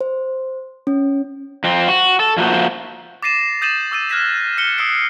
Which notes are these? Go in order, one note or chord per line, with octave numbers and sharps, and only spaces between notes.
C5
C#4
F2 C4
F#4
A4
F3 A3 A#3 F#4 C5
D6 A6 A#6 C7 D#7 E7
D#6 G6 A6 D#7 E7 F#7
D6 E6 A6 D#7
F6 F#6 G#6 A#6 B6 E7
F6 C#7 G7
D#6 E6 F#6 C7 D7